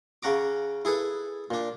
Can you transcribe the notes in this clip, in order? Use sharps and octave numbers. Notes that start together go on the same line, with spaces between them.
C#3 C#4 F#5 A#5 D6
E4 G#4 A4 B4
A#2 D4